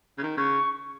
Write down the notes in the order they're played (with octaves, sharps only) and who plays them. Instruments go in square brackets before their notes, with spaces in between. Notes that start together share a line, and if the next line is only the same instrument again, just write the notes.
[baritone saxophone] C#3
D#3
[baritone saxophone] C#3 [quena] C#6